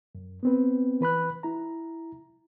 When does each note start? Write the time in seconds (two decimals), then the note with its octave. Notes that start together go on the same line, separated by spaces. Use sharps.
0.15 F#2
0.43 B3 C4 B4
1.01 E3 B4 B5 F#6
1.43 E4 A#5